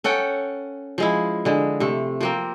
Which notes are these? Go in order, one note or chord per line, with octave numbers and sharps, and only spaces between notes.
C#4 A4 F#5 G5
F3 G#3 E4
D3 G#3
C3 A3
F3 A#3 C4